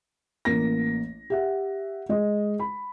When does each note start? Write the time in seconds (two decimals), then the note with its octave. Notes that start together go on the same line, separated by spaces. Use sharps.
0.45 A1 A#3 A#6
1.30 G4 E5 F#5
2.09 G#3 D#5
2.60 B5